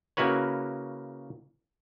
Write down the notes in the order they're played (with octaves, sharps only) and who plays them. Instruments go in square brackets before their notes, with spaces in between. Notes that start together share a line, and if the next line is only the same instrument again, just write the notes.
[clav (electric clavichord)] C#3 A#3 E4 F#4 B4 C#5